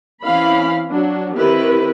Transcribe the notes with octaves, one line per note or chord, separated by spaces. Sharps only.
E3 C4 C#4 E4 F5 B5
F#3 D4
D#3 C4 E4 G4 B4